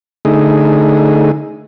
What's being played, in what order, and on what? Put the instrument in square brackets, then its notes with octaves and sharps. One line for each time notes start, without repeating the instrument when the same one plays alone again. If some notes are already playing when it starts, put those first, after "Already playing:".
[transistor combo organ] D3 A3 D#4 G#4